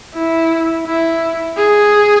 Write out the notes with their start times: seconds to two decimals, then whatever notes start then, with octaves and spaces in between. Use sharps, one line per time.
0.14 E4
0.87 E4
1.57 G#4